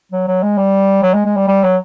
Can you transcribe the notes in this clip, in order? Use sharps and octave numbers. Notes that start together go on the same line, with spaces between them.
F#3
F#3
G#3
G3
F#3
G#3
G#3
G3
G3
F#3